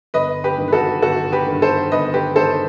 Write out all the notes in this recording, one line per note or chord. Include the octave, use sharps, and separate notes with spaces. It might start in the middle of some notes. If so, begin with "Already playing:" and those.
G1 B4 D#5
G4 B4
G2 D#3
B4
F#4 A4
G1 F#4 A4
G4 B4
G2 D#3
A4 C5
G1 B4 D#5
G4 B4
G2 D#3 A4 C5